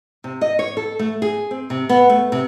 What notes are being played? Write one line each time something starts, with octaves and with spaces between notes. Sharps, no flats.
C3
D#5
C#5
A4
A3
G#4
C4
C3
B3
A3
C3